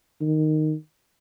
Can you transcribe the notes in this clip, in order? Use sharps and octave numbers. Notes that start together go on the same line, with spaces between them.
D#3